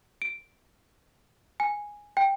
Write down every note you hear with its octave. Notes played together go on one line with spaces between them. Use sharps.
D7
G#5
G5